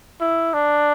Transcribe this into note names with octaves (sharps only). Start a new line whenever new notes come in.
E4
D4